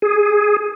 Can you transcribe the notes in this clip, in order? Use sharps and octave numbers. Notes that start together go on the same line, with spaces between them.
G#4